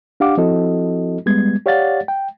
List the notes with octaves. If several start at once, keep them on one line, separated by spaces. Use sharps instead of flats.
D4 G4 F5 F#5 D6
F3 C4 E4 F#4 A4 D#5
G3 G#3 B3 G#6
G4 C#5 D5 F5 F#5 A6
G5